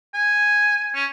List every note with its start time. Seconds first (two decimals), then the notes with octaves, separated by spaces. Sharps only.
0.14 G#5
0.94 C#4